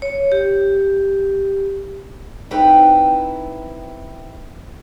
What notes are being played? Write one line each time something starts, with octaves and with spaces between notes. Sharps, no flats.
C#5
G4
C4 D#4 E4 B4 G5